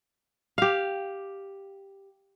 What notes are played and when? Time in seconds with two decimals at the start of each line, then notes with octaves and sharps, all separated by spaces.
0.58 G4 F5